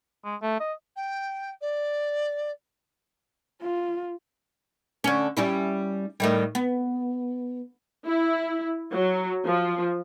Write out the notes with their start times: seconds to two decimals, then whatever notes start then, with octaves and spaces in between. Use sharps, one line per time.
0.25 G#3
0.42 A3
0.60 D#5
0.96 G5
1.61 D5
3.61 F4
5.04 D3 C#4
5.37 G3 C#4 E4
6.20 A2 D#3 G3
6.55 B3
8.06 E4
8.92 F#3
9.45 F3